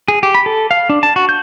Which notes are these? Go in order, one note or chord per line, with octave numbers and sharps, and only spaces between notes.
G#4
G4
B5
A4
F5
D4
A5
F#4
G6